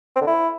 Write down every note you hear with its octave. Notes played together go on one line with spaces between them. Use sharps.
C4
D3
E4